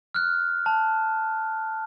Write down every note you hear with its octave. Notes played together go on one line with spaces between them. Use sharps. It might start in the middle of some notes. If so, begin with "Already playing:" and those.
F6 F#6
A5